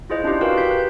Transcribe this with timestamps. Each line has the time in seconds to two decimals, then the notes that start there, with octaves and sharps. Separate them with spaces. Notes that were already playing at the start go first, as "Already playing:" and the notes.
0.10 E4 F4 G#4 C5 D#5
0.23 C#4 D4 E4 F4 G4
0.41 F#4 G4 A#4 B4 F5 G5
0.57 G6 B6
0.71 B4